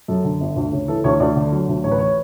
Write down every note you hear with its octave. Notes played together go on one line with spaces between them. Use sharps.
F#2 A4
D3
G1
D2
C#3
E3 A4
D2 C#5
D2 D5
D3
F#3
D2
A1 C#5
B4
C#5